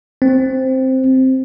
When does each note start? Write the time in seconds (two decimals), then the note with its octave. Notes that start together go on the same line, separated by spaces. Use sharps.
0.22 C4